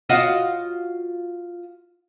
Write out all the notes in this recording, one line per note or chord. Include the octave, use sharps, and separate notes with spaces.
F4 F#4 D#5